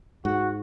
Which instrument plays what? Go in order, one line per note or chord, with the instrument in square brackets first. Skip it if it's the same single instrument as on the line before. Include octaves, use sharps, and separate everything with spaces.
[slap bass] G#2 [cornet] F#4